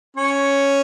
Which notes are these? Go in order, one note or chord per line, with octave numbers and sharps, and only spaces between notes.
C#4